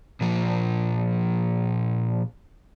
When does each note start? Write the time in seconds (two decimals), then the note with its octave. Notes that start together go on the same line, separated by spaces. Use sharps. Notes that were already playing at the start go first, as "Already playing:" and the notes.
0.21 A#2 F3